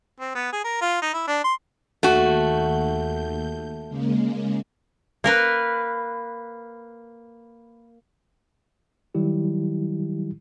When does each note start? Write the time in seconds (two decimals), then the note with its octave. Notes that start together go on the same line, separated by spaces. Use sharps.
0.20 C4
0.35 B3
0.52 G#4
0.64 A#4
0.81 F4
1.02 D#4
1.13 E4
1.27 D4
1.44 C6
2.03 D#2 A3 F#4 G6
3.88 C#3 G#3 A#3
5.24 A#3 A#4 B4
9.15 D#3 F#3 G3 E4 G4